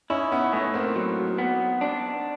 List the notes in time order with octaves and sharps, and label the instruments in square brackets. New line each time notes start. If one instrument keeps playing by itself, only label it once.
[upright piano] C#4 D#4 [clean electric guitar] E4
[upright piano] B3 C#4
[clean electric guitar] A2 [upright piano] B3 C#4
[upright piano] A#3 C4
[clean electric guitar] F#3
B3
D4